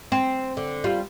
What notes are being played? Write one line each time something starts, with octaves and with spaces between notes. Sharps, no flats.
C4
D3
G3 F4